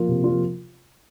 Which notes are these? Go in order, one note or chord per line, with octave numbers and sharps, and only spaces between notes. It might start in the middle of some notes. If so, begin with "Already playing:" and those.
Already playing: F3 A#3 F4
C3
F3 A#3 F4